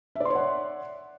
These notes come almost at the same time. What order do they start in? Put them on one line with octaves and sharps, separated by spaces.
E5 D5 C6 C#5 F#5